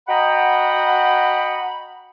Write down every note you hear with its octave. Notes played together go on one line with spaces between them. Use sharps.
F#4 D#5 F#5 G5 A#5 B5